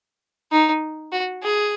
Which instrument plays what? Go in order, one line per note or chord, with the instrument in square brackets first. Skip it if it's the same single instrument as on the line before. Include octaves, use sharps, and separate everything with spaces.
[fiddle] D#4
F#4
G#4